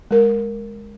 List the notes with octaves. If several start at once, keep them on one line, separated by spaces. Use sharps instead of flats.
G#3 A#4